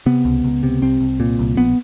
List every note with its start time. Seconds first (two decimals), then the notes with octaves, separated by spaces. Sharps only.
0.06 C3 B3
0.25 C#2
0.44 C#2
0.63 C3
0.82 C2 C4
1.01 C2
1.20 A#2
1.39 C2
1.57 A#1 B3